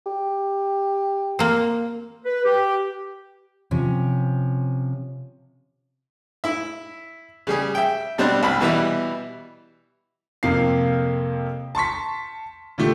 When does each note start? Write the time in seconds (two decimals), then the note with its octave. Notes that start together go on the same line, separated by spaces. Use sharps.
0.06 G4
1.39 A#3 C4
2.25 B4
2.45 G4
3.71 C3 F3 C#4
6.44 E4 E5
7.47 C#3 G3 G#4
7.75 E5 G5
8.18 B2 G3 C4 D4 F#6
8.43 C2 B5
8.60 B2 E3 G3 E5
10.43 F2 C3 A#3 F5 C7
11.75 A5 C6 C#6 B6
12.78 A#2 D3 A3 G4